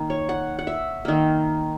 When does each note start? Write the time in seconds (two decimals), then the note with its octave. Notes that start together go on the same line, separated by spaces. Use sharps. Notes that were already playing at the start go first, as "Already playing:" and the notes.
Already playing: D#3 A#3
0.10 C#5
0.29 F#5
0.59 F#5
0.67 E5
1.05 D#3 A#3